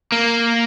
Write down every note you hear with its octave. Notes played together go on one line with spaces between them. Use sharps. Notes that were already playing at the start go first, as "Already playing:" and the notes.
A#3